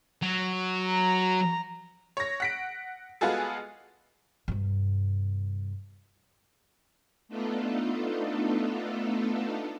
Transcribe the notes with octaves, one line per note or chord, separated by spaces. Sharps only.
F#3
A#5
C#5 A#6
F#5 B6 D7
G#3 B3 F4 F#4 G#4 A4
G2 C3
A3 B3 D4 D#4 F4 A4